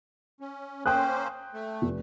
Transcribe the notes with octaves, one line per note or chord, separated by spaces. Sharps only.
C#4
A#3 C#4 C5 G5 D#6 F#6
A3
F1